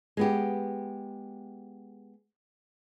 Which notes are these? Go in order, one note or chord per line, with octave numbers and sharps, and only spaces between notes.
G#3 B3 G4